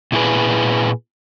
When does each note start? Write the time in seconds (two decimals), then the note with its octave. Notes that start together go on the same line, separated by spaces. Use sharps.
0.12 A#2 E4 G#4 B4